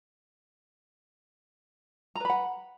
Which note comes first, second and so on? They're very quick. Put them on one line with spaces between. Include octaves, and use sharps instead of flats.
A#5 B4 B5 F#5